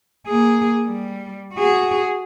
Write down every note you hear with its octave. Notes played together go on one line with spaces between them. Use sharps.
A#3 G#4
G3
F#4 G#4